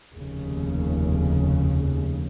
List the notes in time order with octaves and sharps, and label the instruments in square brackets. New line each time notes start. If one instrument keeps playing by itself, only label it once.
[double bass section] F1 D#2 C#3